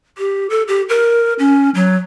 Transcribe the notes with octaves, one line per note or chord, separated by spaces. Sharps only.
G4
A4
G4
A#4
C#4
F#3